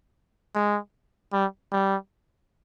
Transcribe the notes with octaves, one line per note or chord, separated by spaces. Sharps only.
G#3
G3
G3